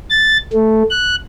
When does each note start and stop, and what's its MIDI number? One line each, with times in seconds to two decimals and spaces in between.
0.10 0.38 93
0.53 0.83 57
0.90 1.16 90